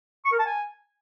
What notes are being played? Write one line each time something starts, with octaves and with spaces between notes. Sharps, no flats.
C#6
A#4
A5
G#5